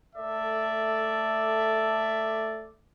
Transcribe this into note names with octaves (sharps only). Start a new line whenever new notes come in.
A3 A4 D5 E5